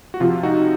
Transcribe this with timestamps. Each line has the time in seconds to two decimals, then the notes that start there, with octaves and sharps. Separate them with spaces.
0.14 F#4
0.20 C3 F3 F4
0.43 D#4 F#4